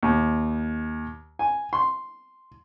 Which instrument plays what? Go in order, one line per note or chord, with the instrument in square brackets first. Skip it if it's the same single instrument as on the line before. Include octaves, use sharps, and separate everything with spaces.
[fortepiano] D#2
G#5
C6